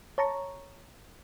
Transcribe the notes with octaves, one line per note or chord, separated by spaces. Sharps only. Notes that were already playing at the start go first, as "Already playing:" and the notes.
C#5 A5 A#5 C#6